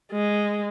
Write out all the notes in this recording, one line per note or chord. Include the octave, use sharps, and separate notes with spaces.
G#3